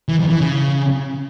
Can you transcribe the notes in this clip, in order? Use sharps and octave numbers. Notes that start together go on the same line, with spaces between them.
E3
F2
E3
C#3